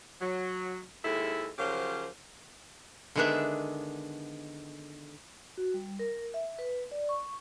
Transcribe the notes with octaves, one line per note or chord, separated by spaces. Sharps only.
F#3
D#2 G#3 E4 A4
C#3 F3 F#3 G4 A#4 C5
D3 D#3 G#3 B3 D4 E5
F#4
G3
A#4
E5
B4
D5
C#6